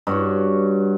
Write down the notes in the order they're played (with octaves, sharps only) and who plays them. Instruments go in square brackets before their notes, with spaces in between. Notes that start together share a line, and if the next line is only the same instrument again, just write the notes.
[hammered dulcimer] G2 F#4 C#5